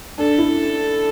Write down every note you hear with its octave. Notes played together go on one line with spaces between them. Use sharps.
D4 A4
E4